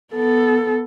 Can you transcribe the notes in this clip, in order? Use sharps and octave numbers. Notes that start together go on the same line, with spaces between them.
B3 A4